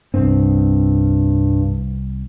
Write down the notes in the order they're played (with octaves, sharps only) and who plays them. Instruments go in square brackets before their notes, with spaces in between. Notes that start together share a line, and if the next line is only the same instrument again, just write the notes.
[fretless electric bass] C2 C4 [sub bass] G2